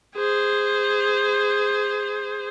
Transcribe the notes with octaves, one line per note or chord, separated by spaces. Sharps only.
G#4 C5